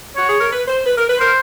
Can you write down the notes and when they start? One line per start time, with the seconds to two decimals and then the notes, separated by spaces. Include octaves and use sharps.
0.16 F#4 C#5
0.28 G#4
0.39 A#4
0.50 B4
0.67 C5
0.85 B4
0.96 A#4
1.07 B4
1.19 A#4 C5